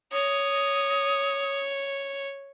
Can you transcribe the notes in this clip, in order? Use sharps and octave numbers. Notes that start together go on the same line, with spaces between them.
C#5 D#6